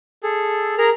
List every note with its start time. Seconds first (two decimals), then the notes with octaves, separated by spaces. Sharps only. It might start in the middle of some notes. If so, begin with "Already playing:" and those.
0.23 G#4 A4
0.78 G#4 A#4 A#5